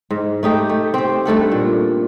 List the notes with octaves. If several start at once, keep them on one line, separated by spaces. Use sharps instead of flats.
G#2
A3 D#4 G4
A3
C4 G4
G2 A3 A4 F#5
A#2